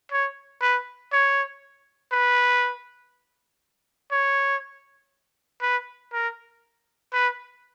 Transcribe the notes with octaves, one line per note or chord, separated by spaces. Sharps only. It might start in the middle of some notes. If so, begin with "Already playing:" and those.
C#5
B4
C#5
B4
C#5
B4
A#4
B4